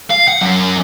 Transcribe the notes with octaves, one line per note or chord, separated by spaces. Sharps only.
F5
F#5
F#2